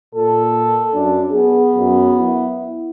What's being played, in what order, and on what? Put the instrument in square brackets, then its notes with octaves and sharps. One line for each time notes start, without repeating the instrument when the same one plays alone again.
[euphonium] A#2 [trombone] A4
[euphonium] F#2 [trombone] D4
[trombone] B3 [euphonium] G#4
[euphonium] F#2
E4